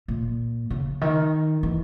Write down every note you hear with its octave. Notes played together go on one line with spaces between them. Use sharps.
A#2
C#3
D#3
E3